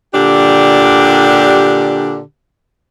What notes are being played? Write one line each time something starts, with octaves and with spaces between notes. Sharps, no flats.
A#2 D3 D4 G4